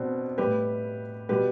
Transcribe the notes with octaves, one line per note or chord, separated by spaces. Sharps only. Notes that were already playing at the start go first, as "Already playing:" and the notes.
Already playing: B2 B3 C4 D4
A2 G3 G4 B4
B2 G3 G4 B4